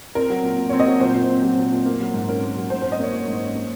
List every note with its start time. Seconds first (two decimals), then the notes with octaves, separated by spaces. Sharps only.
0.15 C4 A#4
0.30 F#3
0.43 A#2
0.58 A#2
0.69 C#5
0.73 C4
0.80 D#5
0.86 F#3
1.00 A#2 C5
1.15 A#2
1.30 C4
1.43 F#3
1.58 A#2
1.72 A#2
1.86 A#3
2.00 F#3
2.14 G#2
2.28 C#4 A#4
2.42 A#3
2.57 F#3
2.70 G#2 C5
2.82 C5
2.85 C#4
2.92 D#5
3.00 A#3 C#5
3.13 F#3
3.28 G#2
3.42 C#4
3.55 A#3